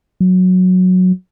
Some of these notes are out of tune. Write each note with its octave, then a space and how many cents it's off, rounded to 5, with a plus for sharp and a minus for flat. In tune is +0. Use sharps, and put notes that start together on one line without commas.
F#3 -10